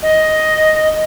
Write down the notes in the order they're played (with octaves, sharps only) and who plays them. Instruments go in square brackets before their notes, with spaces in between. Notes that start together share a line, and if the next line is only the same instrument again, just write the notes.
[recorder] D#5